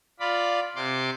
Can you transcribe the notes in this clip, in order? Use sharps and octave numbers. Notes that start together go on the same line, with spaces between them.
F4 D5 B5
C3 C6 D6